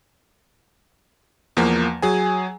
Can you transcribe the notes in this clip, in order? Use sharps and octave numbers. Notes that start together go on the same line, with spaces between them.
E2 F3 A#3
F#3 G#4 G#5